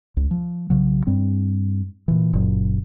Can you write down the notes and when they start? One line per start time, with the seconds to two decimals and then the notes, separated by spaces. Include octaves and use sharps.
0.17 C#2
0.31 F3
0.70 B1 C#3 F#3
1.07 G2 G3 C4
2.08 A#2 E3
2.33 F#1 A#2 F#3